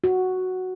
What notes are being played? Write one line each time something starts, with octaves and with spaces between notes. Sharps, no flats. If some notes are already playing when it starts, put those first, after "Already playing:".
F#4